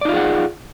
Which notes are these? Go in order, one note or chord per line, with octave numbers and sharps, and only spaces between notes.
D#4 F4 G#4 D5 F#5